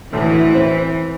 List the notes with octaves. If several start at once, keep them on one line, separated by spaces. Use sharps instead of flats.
D2 A2 E3 A3
C4